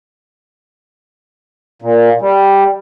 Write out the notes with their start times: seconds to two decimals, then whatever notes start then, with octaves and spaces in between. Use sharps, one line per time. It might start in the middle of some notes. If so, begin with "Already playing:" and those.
1.82 A#2
2.21 G3